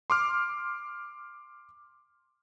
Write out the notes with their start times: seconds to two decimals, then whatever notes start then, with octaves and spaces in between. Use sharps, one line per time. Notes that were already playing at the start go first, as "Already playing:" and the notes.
0.10 C6 D6 F6